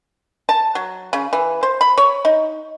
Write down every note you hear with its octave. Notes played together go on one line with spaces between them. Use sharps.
A5
F#3
C#3
E3
C5
B5
C#5
D#4